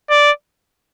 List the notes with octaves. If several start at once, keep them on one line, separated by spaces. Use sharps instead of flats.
D5